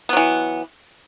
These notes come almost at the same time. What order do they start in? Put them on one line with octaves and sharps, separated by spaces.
B3 F#3 E3